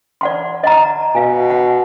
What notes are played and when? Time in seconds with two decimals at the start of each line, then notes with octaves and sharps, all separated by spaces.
0.21 D5 F#5 C6
0.64 D#5 F#5 A#5
1.15 B2 F5 G#5
1.50 F#5